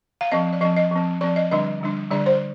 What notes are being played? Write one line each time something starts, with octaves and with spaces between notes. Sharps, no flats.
F5
F3 C4 D#5
D5
F3 C4 D#5
D#5
F3 C4
F3 C4 D5
D#5
D3 G3 D4 D#5
D3 G3 D4
D3 G3 D4 D5
C5